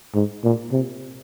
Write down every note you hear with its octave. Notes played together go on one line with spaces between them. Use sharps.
G#2
A#2
C3